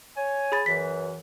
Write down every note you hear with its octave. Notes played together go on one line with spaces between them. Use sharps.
C#5 G#5
G#4 B5 A6
F#2 E3 B6